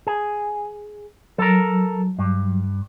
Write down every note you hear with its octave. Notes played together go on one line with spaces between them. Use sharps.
G#4
F#3 A4 A#4
G2